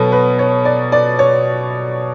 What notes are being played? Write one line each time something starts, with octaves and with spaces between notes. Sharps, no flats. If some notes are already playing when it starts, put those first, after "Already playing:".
Already playing: B2 F#3 A4 B4
B4
C#5
D5
D5
C#5